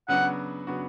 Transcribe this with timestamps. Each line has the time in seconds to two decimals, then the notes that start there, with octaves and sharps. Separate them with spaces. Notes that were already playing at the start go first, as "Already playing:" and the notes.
0.08 C#3 F#3 B3 D4 F#4 F#5
0.67 C#3 F#3 B3 D4 F#4